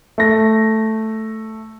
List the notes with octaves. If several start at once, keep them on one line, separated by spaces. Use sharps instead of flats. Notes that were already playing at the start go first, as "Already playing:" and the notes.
A3 A#6